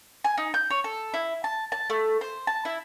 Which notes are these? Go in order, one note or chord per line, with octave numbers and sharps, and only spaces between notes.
G#5
D#4
G6
C#5
A4
E4
A5
A5
A3
C5
A5
E4